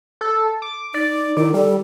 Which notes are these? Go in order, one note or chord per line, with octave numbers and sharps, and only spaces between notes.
A4
D6
D#4 D5
D#3 E4
G3 A4